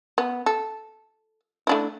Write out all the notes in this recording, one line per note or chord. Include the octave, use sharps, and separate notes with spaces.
B3
A4
A3 D4 E4